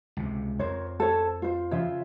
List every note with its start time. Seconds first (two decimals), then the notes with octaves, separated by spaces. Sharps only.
0.17 C#2 C3
0.59 F2 A#4 C5 C#5 G#6
1.00 A4 C5 C#5
1.42 F4 C5
1.71 C#3 F3 F4 C#5 E5